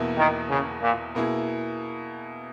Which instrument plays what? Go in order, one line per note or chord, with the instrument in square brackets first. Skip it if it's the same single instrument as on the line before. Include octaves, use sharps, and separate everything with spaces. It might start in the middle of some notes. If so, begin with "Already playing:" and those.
Already playing: [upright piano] E2 B2 A#3 E4
[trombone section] D#3
C#3
A#2
[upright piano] B2 A#3 E4 G#4